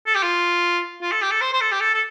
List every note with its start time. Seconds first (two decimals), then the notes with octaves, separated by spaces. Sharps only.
0.07 A4
0.15 G4
0.23 F4
1.02 F4
1.12 A4
1.22 G4
1.31 A4
1.41 C5
1.53 C5
1.61 A4
1.72 G4
1.81 A4
1.94 A4